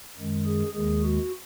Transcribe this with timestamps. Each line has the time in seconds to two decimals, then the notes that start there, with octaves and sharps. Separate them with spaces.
0.17 F#2 D#3 G#3
0.45 G#4
0.73 D#2 D#3 G#3 G#4
1.03 F#4